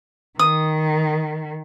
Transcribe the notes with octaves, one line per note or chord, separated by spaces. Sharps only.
D#3 D#6